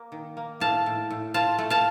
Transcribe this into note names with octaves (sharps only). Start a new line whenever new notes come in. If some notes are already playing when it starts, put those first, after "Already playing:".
Already playing: A#3
D#3
A#3
A2 F5 A5
A2
A2
F4 F5 A5
A3
F5 A5